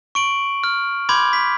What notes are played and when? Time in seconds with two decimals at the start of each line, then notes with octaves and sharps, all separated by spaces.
0.15 C#6 D7 F#7
0.64 F6
1.09 B5 C6 D6 G6 G#6
1.33 B6